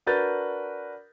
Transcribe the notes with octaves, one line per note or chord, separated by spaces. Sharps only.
D4 F#4 A#4 B4 G6 A6